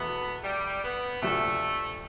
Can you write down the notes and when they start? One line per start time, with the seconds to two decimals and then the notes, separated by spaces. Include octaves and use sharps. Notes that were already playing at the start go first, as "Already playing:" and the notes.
Already playing: E2 B2 A3 B3
0.43 G3
0.83 B3
1.22 D2 C3 F3 A3